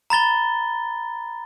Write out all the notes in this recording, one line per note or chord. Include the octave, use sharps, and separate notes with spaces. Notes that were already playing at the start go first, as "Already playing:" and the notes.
A#5 B5 A6 G7